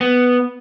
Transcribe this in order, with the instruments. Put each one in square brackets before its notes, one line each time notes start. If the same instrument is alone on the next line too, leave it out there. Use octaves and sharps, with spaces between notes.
[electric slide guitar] B3